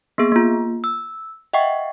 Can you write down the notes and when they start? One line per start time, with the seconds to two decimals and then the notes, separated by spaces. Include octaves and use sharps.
0.18 A#3 B3 G#4
0.32 A#3 F4
0.84 E6
1.53 D#5 E5 F#5 G5 C#6